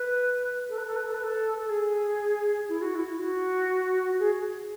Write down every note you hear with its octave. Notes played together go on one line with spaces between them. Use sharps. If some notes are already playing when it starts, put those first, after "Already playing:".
Already playing: B4
A4
B4
A4
B4
A4
B4
A4
A4
G#4
E4
F#4
E4
E4
F#4
G#4